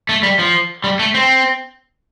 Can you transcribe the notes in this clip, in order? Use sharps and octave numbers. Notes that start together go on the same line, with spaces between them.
A3
G3
F3
G3
A3
C4